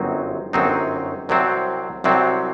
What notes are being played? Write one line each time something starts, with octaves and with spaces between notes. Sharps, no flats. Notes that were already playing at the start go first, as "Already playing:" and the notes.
Already playing: G1 F#2 F#3 C4 D#4
G1 F#2 F#3 C4 D#4
C2 C3 F#3 C4
C2 C3 F#3 C4